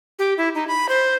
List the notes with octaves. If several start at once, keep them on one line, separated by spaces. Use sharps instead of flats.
G4
E4
D#4
B5
C5